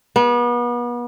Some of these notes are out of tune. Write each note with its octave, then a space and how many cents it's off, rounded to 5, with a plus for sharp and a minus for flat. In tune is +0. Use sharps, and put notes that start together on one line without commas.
B3 -35